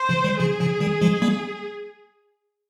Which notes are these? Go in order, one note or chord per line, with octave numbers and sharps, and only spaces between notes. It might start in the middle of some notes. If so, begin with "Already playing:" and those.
Already playing: C5
C#3 F3
D#3 G3
C#3 F3 G#4
C#3 F3
D#3 G3
F3 G#3
G3 A#3